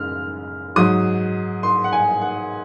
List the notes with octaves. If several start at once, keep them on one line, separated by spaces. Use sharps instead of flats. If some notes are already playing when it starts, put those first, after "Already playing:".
Already playing: F#2 C#3 G#3 F6
G#2 F#3 D#6
C6
F#5
G#5
F#5